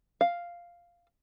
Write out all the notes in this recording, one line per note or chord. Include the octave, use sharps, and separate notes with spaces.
F5